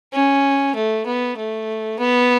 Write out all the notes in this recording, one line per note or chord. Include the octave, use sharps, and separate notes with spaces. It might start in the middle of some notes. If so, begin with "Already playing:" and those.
C#4
A3
B3
A3
B3